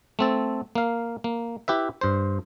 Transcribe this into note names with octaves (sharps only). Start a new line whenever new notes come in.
A3 C4 A4
A#3 F5
A#3
E4 G4 B4 E5
G2 C5